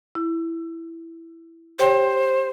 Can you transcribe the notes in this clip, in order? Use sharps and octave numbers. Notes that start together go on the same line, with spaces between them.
E4
G4 C5 C#5 G5